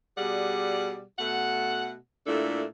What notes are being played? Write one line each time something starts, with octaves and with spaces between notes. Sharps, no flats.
B2 G3 G#4 D5 F#5
B2 A3 F#5
A#2 A3 D4 E4 A4